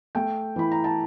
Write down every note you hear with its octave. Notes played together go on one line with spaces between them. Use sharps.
A3 G5
E3 B5
A#5
A5